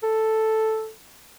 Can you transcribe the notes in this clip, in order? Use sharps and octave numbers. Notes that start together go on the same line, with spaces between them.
A4